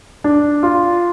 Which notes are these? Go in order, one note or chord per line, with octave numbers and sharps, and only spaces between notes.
D4
F4